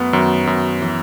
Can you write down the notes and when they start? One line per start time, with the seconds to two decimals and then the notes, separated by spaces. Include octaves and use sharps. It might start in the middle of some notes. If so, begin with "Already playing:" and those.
Already playing: F#2 F#3 A3 B3
0.13 F#2 D#3 F#3
0.47 F#2 D#3
0.82 E3